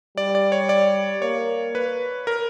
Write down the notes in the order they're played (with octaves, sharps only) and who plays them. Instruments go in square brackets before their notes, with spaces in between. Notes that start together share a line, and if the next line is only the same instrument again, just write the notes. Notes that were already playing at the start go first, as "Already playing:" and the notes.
[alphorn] G3 [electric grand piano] D5
[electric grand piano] D5
C#5
D5
[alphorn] A#3 [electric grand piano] C#5
[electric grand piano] B4
A#4